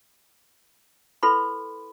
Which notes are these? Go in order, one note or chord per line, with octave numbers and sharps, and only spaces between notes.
E4 A4 B4 B5 C6